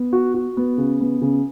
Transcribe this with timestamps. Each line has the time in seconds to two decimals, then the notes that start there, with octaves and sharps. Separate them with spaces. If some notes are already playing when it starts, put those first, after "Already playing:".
Already playing: B3
0.13 F#4
0.34 F#4
0.57 B3
0.78 C#3
1.01 B3
1.22 C#3